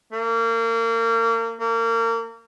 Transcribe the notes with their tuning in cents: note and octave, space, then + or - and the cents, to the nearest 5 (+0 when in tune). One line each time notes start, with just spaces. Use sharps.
A#3 -30
A#3 -30